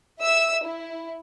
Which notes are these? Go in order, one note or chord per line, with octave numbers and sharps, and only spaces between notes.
E5 E6
E4